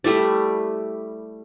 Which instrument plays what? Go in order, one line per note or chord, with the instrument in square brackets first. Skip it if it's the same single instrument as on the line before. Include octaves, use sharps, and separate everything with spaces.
[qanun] G3 A3 E4 D5